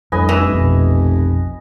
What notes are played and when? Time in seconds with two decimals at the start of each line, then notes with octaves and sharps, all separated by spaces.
0.12 F2 A2 G3 D4 B4 D#5 G#5
0.29 F1 E3
0.49 A#1 F2 B2